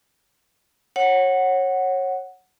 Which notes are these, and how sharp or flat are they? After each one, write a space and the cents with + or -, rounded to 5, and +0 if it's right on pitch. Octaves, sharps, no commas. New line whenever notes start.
C#5 -20 F#5 +0